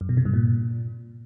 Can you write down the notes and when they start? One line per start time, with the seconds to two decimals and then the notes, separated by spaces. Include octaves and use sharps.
0.01 F#2
0.09 B2
0.17 C3
0.25 G2
0.34 A#2